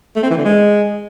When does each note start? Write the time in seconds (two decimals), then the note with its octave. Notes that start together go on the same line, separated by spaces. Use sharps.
0.15 A3
0.23 C4
0.30 E3
0.38 D3
0.45 G#3